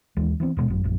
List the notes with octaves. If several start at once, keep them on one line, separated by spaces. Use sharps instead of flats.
D#2 E3 G#3
E3 B3 C4
E2 G2 B2 G#3
G#1 F#2
A#1 F#2